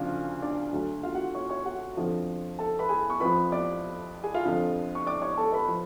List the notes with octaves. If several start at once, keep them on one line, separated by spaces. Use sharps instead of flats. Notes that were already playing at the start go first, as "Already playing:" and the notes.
Already playing: D2 C#3 F3 D4 F4 F5
D4 D5
D2 D3 F#3
F4 F5
F#4 F#5
C#5 C#6
C#5 C#6
F#4 F#5
F2 D3 F3
A4 A5
B4 B5
G#4 G#5
C#6
F2 F3 B4 B5
D5 D6
G#4 G#5
F4 F5
F2 D3 F3
C#6
D5 D6
C#5 C#6
A4 A5
B4 B5
F3